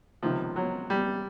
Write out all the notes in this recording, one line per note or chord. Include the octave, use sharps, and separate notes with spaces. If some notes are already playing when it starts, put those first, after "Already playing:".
C#2 C3 D#3 F3
F#3
G3